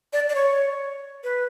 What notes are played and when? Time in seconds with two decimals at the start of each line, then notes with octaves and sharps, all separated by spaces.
0.13 D5
0.29 D5
0.35 C#5
1.24 B4